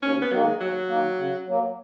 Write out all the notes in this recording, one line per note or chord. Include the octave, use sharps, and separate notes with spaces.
D#2 C#4
B3
D#3 F#3 A#3
G#3
D#2 F#3
D#3 A#3
C#3
F#3 A#3